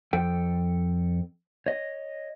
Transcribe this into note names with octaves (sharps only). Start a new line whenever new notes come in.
F2 A4 G5
C#5 D#5